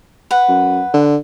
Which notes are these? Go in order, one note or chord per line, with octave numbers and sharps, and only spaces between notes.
B4 F#5
F#2
D3